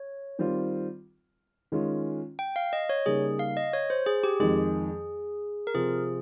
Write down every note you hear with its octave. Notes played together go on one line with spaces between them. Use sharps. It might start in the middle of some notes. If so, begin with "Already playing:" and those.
Already playing: C#5
D#3 G3 C4 F4
D#3 G#3 C#4 F4
G5
F5
D#5
C#5
C#3 G3 A#3 D#4 G#4
F5
D#5
C#5
C5
G#4
G4
F2 D#3 G#3 G#4
A#4
C3 F3 C4 F4 G#4